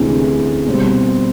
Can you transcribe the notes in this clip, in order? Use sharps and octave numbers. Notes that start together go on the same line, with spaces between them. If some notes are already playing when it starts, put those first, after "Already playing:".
Already playing: D2 C3 E3 G#3 C#4
B2 G3 C4